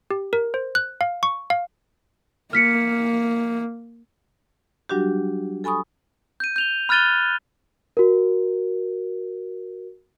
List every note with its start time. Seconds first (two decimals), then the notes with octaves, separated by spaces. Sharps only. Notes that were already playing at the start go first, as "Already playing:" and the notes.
0.11 G4
0.33 A#4
0.54 C5
0.75 F#6
1.01 F5
1.23 C#6
1.50 F5
2.53 A#3 F6 B6 C#7
4.89 F#3 G3 D4 F#4 G4
5.64 A4 G#5 B5 C#6 D#6
6.40 G6 D#7
6.56 G6 F7 G7
6.89 B5 F6 F#6 A6 D#7 G7
7.97 F#4 A#4